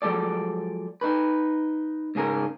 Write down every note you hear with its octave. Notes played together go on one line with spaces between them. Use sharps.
F3 F#3 G#3 A4 D5
D#4 B4
G#2 C#3 G#4 A#4